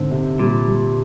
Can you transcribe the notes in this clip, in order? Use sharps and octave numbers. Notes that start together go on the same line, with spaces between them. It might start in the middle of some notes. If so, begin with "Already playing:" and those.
Already playing: G#2 D3 C4
C3
A#2 G3
G3